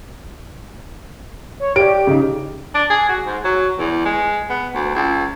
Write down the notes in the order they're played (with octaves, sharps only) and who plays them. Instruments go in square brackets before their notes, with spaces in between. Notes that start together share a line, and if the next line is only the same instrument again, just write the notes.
[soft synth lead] C#5
[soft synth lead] G4 [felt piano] D5 D7
[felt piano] C#3 D#4
[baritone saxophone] D4
G#4
F#4
G#2
F#3
E2
G#3
B3
D2
C#2